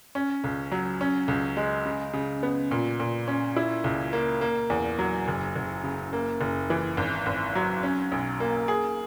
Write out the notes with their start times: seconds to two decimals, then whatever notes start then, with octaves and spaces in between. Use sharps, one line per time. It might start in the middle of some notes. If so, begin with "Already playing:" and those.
0.15 C#4
0.44 C#2
0.72 F#3
1.01 C#4
1.28 C#2
1.57 G#3
1.85 C#3
2.13 C#3
2.43 B3
2.71 A#2
3.00 A#2
3.28 C#4
3.56 E4
3.84 C#2
4.13 A#3
4.41 A#3
4.70 E2
4.99 F#3
5.28 F#1
5.55 F#1
5.84 C#3
6.13 A#3
6.41 F#1
6.70 E3
6.97 G#1
7.26 G#1
7.55 F#3
7.83 C#4
8.12 B1
8.40 A#3
8.68 G#4